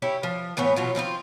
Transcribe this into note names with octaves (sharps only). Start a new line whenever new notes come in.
E4 G4 C#5
F3
A2 E3 B3 C#5
B2 F#3 F4
F3 C4 D#4 F4